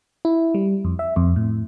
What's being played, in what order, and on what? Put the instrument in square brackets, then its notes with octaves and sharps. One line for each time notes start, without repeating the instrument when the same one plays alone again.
[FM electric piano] E4
G3
F2
E5
F2
A2